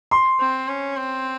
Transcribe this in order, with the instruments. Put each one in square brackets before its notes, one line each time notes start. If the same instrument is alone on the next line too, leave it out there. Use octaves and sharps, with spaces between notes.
[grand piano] C6
[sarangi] C4
C#4
C4